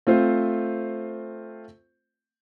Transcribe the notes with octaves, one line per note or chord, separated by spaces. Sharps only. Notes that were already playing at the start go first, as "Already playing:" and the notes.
A3 C4 F4 C5